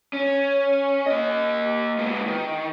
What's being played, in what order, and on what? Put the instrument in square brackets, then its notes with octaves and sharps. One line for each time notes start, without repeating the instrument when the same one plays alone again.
[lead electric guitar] C#4
A#3 D#5
G#2 B3
D#3